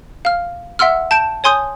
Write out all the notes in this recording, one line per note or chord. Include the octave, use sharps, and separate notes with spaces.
F5 F6
E5 F#5 C6 E6 F6
A5 G6 D7 E7
C#5 G#5 C6 D#6 G6